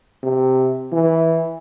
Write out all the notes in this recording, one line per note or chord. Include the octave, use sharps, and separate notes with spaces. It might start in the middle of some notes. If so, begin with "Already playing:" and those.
C3
E3